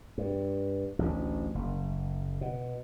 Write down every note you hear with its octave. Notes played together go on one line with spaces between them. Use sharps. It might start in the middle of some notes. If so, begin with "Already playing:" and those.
G2
A1 D2
F#1
B2